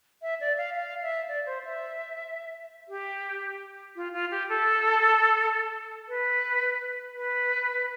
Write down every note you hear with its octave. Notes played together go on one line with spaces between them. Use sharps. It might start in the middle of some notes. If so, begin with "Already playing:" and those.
E5
D5
F5
F5
E5
D5
C5
E5
G4
F4
F4
G4
A4
B4
B4